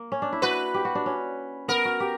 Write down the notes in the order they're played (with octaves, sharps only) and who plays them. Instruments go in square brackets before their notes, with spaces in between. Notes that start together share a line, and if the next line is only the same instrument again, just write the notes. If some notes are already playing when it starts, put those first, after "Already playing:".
Already playing: [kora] A#3
C#4
D4
E4
[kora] F#4 [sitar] B4
[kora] G4
F#4
D4
C#4
[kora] B3 [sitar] A#4
[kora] F#4
G4